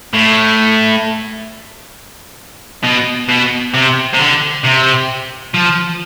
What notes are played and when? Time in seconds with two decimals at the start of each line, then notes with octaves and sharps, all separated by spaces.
0.13 A2
2.83 B2
3.29 B2
3.74 C3
4.13 C3
4.18 D3
4.64 C3
5.54 F3